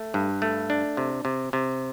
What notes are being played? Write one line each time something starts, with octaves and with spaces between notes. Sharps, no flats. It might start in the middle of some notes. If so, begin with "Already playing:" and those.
Already playing: A3
G2
A3
D4
C3
C3
C3